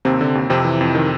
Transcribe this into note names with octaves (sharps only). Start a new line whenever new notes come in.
D#2 C3 C4
D3
D#2
F2 C3 C4
E3
F2
D#3